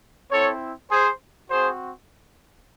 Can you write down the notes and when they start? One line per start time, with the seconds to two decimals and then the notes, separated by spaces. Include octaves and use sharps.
0.32 C4 E4 A4 C#5
0.91 G#4 C5
1.50 C4 F#4 G#4 C5